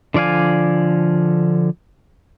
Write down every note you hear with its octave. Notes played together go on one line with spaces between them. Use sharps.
D3 F3 D5 F5 G#5